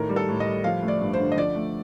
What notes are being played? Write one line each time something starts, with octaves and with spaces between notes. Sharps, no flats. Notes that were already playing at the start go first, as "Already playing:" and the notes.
Already playing: A2 D#3 A#4
G3
A4
A2
D#5
G3
F3 F5
A3
D5
G2
C5
D3
D#5
F3 D5
A3